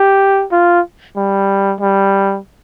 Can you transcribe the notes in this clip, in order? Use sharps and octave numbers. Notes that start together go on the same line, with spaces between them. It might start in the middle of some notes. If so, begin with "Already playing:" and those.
Already playing: G4
F4
G3
G3